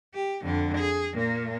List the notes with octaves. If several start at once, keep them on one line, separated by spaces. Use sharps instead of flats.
G4
F2 D3
G#4
A#2 A#3